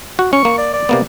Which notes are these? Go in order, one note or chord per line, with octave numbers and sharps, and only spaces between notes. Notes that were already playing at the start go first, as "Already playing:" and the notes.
F#4
C#4 C#6
A#3
D5
D5
C3 A#3 B3